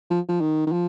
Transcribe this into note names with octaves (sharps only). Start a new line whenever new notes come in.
F3
F3
D#3
D#3
F3